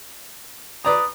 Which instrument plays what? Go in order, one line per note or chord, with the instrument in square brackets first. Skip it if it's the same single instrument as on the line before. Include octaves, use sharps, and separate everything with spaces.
[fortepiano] B4 D5 A#5 [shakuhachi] D#6